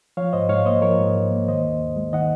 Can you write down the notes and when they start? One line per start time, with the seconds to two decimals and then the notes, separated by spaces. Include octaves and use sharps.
0.17 F3 C#5 F5
0.33 G#2 C5 D#5
0.49 G#2 C#5 F5
0.66 A#3 C5 D#5
0.82 F3 A#4 C#5
0.99 G#2
1.15 G#2
1.31 A#3
1.48 D#3 C5 D#5
1.65 D#2
1.81 D#2
1.97 G#3
2.13 D#3 D#5 F#5